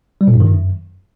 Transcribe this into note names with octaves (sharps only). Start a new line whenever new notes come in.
G3
A#2
G2
D#3
F#2